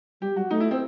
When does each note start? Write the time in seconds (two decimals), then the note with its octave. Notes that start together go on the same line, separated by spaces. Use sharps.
0.21 G3 G4
0.36 G3 F#4
0.50 A3 D#4
0.60 E4
0.71 C4